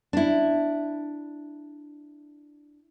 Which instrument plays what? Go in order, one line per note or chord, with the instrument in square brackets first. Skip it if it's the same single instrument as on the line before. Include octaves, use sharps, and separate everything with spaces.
[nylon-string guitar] D4 E4